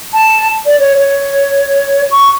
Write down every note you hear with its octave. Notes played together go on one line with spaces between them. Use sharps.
A5
D5
C#5
C#5
C#6